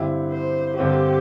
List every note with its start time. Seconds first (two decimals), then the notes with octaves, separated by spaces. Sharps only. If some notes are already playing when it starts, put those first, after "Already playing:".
Already playing: G2 D3 C4 E4 G4
0.31 C5
0.78 G2 D3 C4 G4